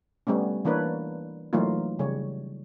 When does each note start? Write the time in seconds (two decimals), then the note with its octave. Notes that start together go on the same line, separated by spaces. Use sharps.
0.27 G3 A3 B3 C#4
0.65 E3 A#3 D4 A#4 B4 C#5
1.53 E3 F#3 A3 A#3 D#4 F4
1.99 C#3 G3 C#5